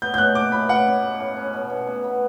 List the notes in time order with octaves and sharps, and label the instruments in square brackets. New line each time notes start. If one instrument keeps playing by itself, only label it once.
[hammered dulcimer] B3 [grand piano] G6
[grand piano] G6
[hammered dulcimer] E3 [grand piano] F#6
[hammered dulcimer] F#4 [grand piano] D6
[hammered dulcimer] E3 [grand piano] B5
[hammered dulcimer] A2 [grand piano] F#5
[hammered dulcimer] C#4
A2
A2
C#4
B2
B2
B2
B3